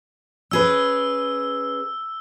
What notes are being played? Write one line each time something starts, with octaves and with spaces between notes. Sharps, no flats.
C#4 G#4 B4 E6